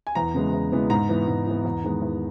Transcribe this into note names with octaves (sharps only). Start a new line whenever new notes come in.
G#5
E2 A#5
C#3 E3 G#3 B3
E2
C#3 E3 G#3 B3
G#2 A#5
E3 B3
G#2
E3 B3
E2
D#3 G#3 B3
E2